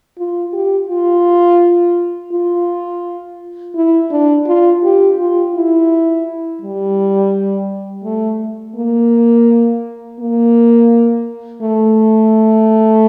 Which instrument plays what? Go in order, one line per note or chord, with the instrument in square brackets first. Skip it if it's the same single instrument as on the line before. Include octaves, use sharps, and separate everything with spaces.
[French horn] F4
G4
F4
F4
E4
D4
F4
G4
F4
E4
G3
A3
A#3
A#3
A3